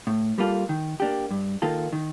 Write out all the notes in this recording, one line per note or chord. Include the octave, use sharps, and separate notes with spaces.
A2
G3 A#3 F4 A4
D#3
A#3 D4 G4
G2
D#3 A#3 F4 A4
D#3